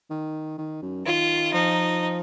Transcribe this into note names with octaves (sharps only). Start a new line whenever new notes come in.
D#3
D#3
F#2
D#3 F4
F3 D#4